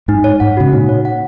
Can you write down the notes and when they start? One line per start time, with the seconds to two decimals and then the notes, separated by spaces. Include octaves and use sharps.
0.08 G#2 D#4
0.24 C#5
0.40 G#2 F#5
0.57 C#3 F#4
0.72 A#2 D#4
0.89 C#5
1.05 F#5